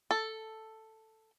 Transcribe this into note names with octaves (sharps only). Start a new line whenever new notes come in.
A4